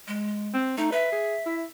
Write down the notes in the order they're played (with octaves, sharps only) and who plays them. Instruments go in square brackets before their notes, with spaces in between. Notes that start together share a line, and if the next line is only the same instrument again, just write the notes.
[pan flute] G#3
[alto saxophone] C4
[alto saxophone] A3 [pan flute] D#4
[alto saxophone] B4 [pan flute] E5
[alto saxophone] G#4
E4